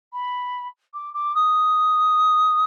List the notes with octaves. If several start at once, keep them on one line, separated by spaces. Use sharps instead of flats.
B5
D6
D6
D#6